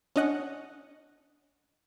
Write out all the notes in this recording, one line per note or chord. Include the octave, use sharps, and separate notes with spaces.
C#4 D4 D#5 F#5